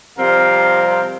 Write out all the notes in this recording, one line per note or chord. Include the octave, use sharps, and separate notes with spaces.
C3 F3 G3 C4 A#4 F5